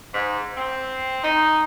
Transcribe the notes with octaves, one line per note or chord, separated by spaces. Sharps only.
G#2
C4
D#4